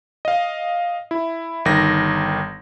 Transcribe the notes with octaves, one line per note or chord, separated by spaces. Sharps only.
D#5 F5
E4
G1 D#3 A#6